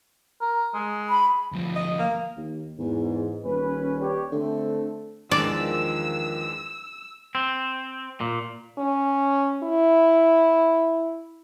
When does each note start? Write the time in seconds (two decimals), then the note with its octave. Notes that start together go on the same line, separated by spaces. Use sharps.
0.41 A#4
0.74 G#3
1.10 B5
1.53 D2 F3
1.76 D#5
1.99 A#3
2.37 D#2
2.79 E2 G#2
3.45 D#1 C#4 B4
4.00 D4 G4 C#5
4.32 D3 A3 C4 A4
5.31 E2 D#3 F3 G#3 D4 D5 E6
7.35 C4
8.21 A#2
8.78 C#4
9.64 E4